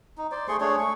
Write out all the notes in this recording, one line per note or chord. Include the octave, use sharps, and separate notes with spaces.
D#4
C5 D5
A3 G#4 C6 C#6
A3 D4 G#4 C#5
A3 C#6